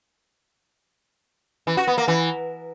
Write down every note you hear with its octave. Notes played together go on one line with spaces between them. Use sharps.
E3
F#4
B3
A#3
E3